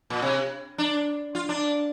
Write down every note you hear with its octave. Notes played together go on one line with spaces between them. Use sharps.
A#2
C3
D4
F4
D4